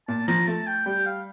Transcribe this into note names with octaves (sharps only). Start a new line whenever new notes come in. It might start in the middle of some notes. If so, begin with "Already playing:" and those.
A#2 A5
F3 A#5
A3 A5
G5
G3 G5
F5